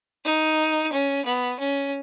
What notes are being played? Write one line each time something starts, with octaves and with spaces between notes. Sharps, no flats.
D#4
C#4
B3
C#4